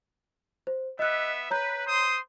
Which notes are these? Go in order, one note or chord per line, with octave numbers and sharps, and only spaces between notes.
C5
B3 D#5 E5 F#6
B4 C#5 A#5 G6
C5 C6 D#6